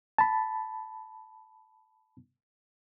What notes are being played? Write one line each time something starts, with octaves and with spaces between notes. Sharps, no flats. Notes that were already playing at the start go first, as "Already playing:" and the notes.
A5 B5